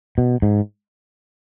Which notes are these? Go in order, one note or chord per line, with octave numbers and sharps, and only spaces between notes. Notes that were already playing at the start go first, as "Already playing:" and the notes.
B2
G#2